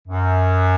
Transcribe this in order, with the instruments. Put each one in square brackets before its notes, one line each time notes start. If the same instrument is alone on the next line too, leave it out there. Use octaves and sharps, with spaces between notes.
[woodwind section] F#2